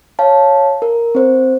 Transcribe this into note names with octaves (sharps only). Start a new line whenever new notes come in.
C#5 F5 A5
A#4
C4 C5